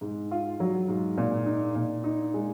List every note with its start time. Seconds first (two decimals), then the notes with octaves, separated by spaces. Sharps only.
0.01 G#2
0.31 F4
0.60 F#3
0.88 G#2
1.18 A#2
1.46 D#4
1.76 A#2
2.04 D#4
2.34 G#3